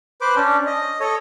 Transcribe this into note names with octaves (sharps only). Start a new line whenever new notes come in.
B4 C5 D6
C#4 D4
D#5
A4 C#5 D#5